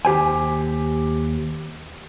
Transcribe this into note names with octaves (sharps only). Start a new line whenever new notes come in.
D#2 G4 C5 G#5